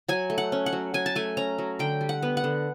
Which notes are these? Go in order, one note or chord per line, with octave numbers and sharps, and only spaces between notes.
F#3 G#5
A3
F#5
C#4
F#5
F#3
F#3 G#5
A5
A3 G#5
C#4 A#5
F#3
D3 G5
G3
F#5
B3
F#5
D3